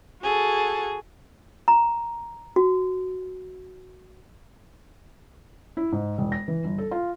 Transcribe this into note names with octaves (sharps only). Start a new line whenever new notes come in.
F#4 G#4 A4
A#5
F#4
E4
G#2
E1
A#6
E3
G1
A4
F4